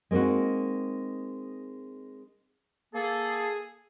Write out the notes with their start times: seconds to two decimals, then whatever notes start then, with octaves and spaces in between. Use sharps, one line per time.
0.11 G#3 A#3 C4 D#4 F#4
2.94 A#3 G#4 A4